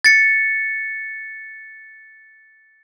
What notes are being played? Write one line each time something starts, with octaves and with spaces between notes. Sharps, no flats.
A6 C#7